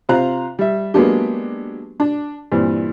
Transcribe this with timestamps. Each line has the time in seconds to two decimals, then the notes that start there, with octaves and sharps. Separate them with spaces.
0.09 C3 F4 C5 F5 A#5 F#6
0.59 G3 E5
0.94 F#3 G#3 A#3 B3 D4 G4
2.00 D4
2.52 G2 A#2 E3 C4